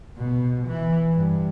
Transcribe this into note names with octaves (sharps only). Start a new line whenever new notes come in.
B2
E3
G2